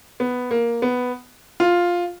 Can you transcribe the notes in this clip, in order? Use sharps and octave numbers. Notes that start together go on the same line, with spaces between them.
B3
A#3
B3
F4